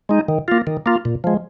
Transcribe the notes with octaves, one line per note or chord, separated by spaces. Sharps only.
G#3 D#4
D#3
A#3 F4
D#3
A#3 F4
A#2
F3 G#3